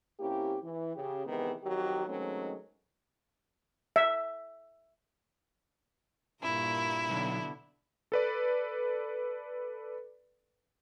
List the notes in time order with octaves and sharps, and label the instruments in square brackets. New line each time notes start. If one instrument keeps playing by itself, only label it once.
[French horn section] C3 A#3 C#4 E4 G4
E3
C#3 G4
C3 D#3 E3 G#3 B3
F2 D#3 F#3 F#4 G4
D#3 F#3 G#3 A3 C4 C#4
[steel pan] E5
[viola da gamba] G2 A#2 A#4 [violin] E4
[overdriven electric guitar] B1 [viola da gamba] B2 D3 B3
[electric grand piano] A4 B4 D5